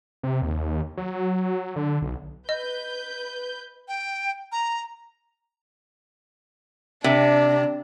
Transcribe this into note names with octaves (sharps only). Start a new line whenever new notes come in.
C3
D#2
F#3
D3
B1
B4 D#5 G6
G5
A#5
C3 D4